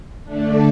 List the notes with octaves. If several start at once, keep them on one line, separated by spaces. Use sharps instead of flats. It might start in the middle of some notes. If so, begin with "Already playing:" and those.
D3 A3 D4